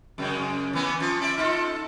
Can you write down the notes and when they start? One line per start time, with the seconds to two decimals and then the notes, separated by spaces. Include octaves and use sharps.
0.18 F#2 C#3 G#3
0.73 E3 B3 C#4
1.00 F3 F4
1.21 C#4 D5 E5
1.38 D#4 F4 A4